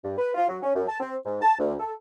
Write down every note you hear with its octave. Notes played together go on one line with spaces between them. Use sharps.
G2
B4
F4
F#3
C#4
F#2
A5
C4
G#2
A5
D2
A4